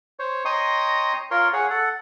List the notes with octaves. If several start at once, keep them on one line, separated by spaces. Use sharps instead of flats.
C5 C#5
C#5 D#5 G5 A#5 C6 D#6
F4 A#4 C#5 C6
G#4 C#5 F#5
A4 F#5